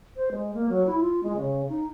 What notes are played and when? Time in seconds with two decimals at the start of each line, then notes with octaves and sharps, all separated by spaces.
0.16 C5
0.31 G#3
0.54 A#3
0.69 F#3
0.87 E4
1.00 F4
1.23 G#3
1.36 C#3
1.69 D#4